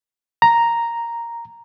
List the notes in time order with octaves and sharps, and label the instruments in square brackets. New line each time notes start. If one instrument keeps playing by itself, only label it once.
[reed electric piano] A#5